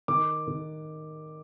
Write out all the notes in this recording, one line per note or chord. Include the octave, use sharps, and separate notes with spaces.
D#3 D6
D#3